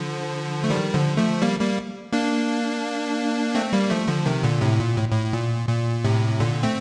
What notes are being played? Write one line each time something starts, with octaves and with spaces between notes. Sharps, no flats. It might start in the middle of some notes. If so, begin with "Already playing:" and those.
Already playing: D3 F3
A3
D#3 G3
D3 F3
F3 A3
G3 A#3
G3 A#3
A#3 D4
A3 C4
G3 A#3
F3 A3
D3 F3
C3 D#3
A#2 D3
A2 C3
A#2
A2
A2
A#2
A#2
A2 C3
A#2 D3
A3 C4